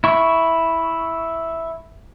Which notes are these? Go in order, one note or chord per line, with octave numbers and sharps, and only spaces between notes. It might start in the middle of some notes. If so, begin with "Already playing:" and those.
E4 C#6